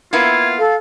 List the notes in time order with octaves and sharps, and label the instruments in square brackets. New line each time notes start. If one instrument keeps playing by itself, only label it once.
[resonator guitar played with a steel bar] A#3 B3 E4 [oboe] F4 [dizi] G#6
[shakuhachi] A4 [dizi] F5